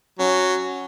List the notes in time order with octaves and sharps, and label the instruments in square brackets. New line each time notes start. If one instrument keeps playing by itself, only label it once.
[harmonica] F#3 [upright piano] C#4